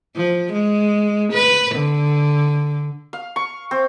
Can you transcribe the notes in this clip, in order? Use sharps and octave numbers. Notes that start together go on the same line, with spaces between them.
F3
G#3
B4
D3
F5
C#6
C4